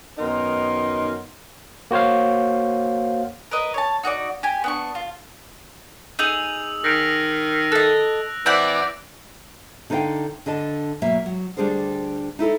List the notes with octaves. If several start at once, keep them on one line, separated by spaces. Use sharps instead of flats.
F#2 D#3 B3 D#4 A#4 C6
A#3 F#4 C5 C#5 F5
A#4 B4 D#5
C#5 A5
D#4 F#4 C#5 D5
G4 G#5
B3 D4 C#6
F4
D#4 G#4 E6 F7 F#7
D#3 A#6 D7 F7
A4 D#5 F#6
E3 C4 D5 E5 F#5 D6 D7
D3 D#4 A#4 C#5 F5 G5
D3 D4 D#5 A5
B2 F#3 A#3 E5
F#3
D2 G3 D4 G#4 A#4 C5
D#4 E4 A4 A#4